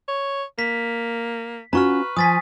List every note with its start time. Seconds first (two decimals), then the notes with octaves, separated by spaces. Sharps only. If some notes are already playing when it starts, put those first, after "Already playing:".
0.08 C#5
0.59 A#3 B6
1.73 C#4 F4 F#4 B4 A#5 C#6 F6
2.17 F3 G#5 D#6 A6 B6